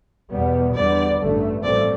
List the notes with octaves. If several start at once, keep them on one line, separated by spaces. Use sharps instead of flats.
E2 B2 G3 B3
E2 D3 G3 B3 D5
A1 G2 D3 A3
A1 G2 F3 A3 C4 D5